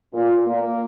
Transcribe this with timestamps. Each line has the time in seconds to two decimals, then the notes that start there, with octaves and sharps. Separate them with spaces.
0.13 A#2
0.46 A#3